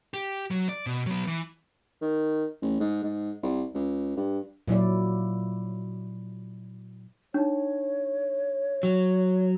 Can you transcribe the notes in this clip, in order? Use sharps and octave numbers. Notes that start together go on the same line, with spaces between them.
G4
F#3
D5
B2
F#3 B3
E3
D#3
A1
G#2
G#2
C2
C#2
G2
A#2 F#3 E4 D5
D4 D#4 C#5
F#3